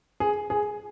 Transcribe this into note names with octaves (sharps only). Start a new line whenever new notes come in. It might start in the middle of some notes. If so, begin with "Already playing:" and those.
G#4
G#4